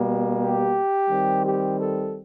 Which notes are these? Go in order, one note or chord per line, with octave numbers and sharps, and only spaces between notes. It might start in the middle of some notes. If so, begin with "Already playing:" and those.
Already playing: B2 G3 A#3
G4
D#3 G3 C4
G4
A4